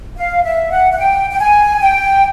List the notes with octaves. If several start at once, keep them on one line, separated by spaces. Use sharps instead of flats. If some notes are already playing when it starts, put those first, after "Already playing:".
F5
E5
F#5
F#5
G5
G5
G#5
G5